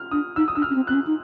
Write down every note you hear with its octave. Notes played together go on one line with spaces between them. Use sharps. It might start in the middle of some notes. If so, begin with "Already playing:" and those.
Already playing: F6
D4 D#6
D#4 E6
D#6
D4 E6
F6
C#4
C4
C4 F#6
C#4
D#4